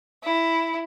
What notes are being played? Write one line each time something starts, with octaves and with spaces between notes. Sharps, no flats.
E4